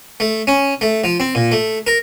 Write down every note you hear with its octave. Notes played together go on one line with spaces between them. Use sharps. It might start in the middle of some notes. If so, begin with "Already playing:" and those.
A3
C#4
A3
F3
C4
A#2
A3
A#4